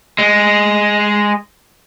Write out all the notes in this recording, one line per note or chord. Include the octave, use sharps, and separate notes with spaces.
G#3